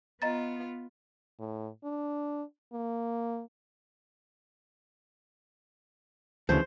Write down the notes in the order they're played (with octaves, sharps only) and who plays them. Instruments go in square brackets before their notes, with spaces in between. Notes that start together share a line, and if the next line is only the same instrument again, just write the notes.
[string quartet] B3 F4 [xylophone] D#5 A#5 A6
[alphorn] A2
D4
A#3
[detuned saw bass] D2 [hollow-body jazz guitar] C#3 E3 F3 [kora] C5